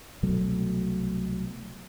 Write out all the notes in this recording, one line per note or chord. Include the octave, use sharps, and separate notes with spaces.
C2 B2 F#3 A3